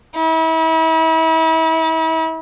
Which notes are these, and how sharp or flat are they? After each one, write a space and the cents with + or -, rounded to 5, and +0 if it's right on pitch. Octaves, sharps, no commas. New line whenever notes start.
E4 -40